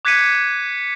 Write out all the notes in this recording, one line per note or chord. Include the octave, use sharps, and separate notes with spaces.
D6 F#6 G#6 B6 C#7 D#7